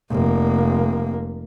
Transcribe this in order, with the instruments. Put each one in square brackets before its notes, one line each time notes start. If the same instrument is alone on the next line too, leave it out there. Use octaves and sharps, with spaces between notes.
[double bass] F1 A#3